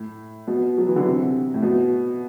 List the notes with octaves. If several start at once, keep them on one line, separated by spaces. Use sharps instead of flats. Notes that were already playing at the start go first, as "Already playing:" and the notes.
Already playing: A2
B2
F#3
E3
D3
C3
A2
B2